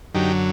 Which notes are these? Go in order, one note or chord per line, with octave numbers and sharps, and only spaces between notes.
F#2 D3 F#3 D#4 G4